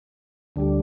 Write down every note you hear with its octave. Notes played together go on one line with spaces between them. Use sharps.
D2 D3 G3